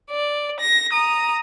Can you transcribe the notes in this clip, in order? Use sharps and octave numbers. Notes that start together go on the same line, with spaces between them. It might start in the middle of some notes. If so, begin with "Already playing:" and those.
D5
A#6
A#5 D#6